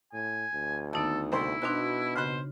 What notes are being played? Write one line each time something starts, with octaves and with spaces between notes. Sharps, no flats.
A2 G#5
D2
D#2 B3 D#4 A4 A5
C2 E4 C5 C6
B2 D4 D#4 F#4 C5 C6 F#6
C#3 C5 B5 C6 F#6